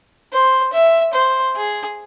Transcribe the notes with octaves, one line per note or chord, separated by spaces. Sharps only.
C5
E5
C5
G#4